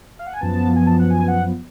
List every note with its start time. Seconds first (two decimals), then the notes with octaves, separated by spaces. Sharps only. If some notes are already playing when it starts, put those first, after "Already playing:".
0.19 F5
0.27 F#5
0.33 G#5
0.41 F#2 F3 B3 A5
0.76 G#5
0.86 A5
0.99 F#5
1.10 G#5
1.28 F#5